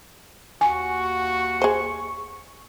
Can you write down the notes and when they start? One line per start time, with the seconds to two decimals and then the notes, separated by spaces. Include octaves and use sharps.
0.61 D#2 F#4 G#5 C#6
1.62 G#4 C5